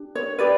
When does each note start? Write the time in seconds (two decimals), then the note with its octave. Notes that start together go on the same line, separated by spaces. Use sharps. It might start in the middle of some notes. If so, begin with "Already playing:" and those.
Already playing: D4 G4
0.15 C#5
0.39 G4 B4 D5